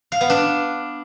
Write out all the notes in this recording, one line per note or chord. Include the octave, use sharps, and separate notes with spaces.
F5
B3
D4